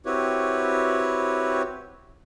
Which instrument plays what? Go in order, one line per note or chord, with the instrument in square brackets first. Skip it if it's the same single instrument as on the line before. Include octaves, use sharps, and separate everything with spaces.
[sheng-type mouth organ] C4 E4 F#4 G4 B4 C#5